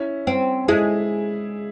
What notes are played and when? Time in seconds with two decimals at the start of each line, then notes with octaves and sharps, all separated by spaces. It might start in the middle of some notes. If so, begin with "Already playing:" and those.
Already playing: C#4 E4
0.27 C4
0.68 G#3 E4 G#4